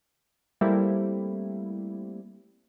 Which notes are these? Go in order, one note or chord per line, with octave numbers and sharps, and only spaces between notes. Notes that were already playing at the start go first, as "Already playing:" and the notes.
G3 A3 A#3 C4 E4